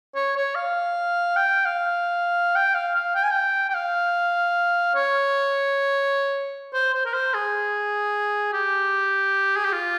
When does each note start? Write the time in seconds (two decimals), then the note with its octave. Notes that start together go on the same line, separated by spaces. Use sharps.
0.15 C#5
0.36 C#5
0.55 F5
1.36 G5
1.65 F5
2.55 G5
2.74 F5
2.95 F5
3.15 G5
3.23 G#5
3.31 G5
3.69 G5
3.74 F5
4.95 C#5
6.73 C5
6.94 C5
7.05 A#4
7.13 C5
7.34 G#4
8.53 G4
9.56 G#4
9.65 G4
9.72 F4